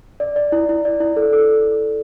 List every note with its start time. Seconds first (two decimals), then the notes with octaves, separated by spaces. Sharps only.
0.20 D5
0.36 D5
0.52 E4
0.69 E4
0.85 D5
1.00 E4
1.16 A4
1.33 A4